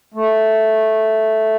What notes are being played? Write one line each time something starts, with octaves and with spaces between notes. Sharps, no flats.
A3